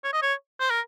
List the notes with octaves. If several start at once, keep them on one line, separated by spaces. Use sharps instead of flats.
C#5
D#5
C#5
C5
A#4